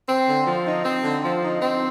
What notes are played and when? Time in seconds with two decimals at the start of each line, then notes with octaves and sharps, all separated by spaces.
0.08 C4
0.27 D3
0.47 F3
0.66 D#4
0.85 C4
1.04 D3
1.24 F3
1.43 D#4
1.61 C4